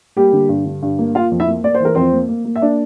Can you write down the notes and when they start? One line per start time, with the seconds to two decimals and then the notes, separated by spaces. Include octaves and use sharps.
0.16 G3 A#3 G4
0.33 D3
0.49 G2
0.65 D3
0.82 G2
0.99 A#3
1.15 A#3 F4 F5
1.31 F2
1.40 E4 E5
1.48 A#3
1.64 A#3 D5
1.74 C5
1.80 E3 A#4
1.95 F2 C4 C5
2.12 A#3
2.29 A#3
2.45 A#3
2.56 E5
2.61 A#3 D4 D5